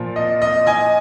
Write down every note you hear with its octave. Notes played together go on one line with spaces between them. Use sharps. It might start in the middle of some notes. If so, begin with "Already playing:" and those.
Already playing: A#2 F3
D#5
D#5
D#5 G#5